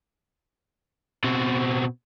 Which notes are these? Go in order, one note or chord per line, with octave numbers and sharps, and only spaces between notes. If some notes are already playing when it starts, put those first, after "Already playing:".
B2 C4